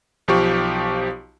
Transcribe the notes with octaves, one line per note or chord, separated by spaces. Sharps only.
B1 F3 G4 C#6